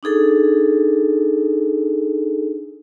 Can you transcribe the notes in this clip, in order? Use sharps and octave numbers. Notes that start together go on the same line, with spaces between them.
D4 D#4 G#4 A4